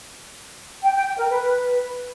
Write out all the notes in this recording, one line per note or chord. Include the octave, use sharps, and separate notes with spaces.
G5
G5
G5
A#4
B4